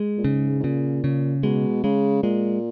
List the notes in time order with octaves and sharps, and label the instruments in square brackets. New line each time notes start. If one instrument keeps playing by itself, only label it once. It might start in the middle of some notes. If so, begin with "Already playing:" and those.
Already playing: [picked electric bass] G#3
[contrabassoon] A#2
[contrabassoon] G#2 [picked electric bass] C#3
[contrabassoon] G#2
[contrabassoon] A#2 [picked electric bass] C#3
[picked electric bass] C#3
[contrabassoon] B2 [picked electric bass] G#3
[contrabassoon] C#3 [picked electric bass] G#3
[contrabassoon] A#2 [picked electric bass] G#3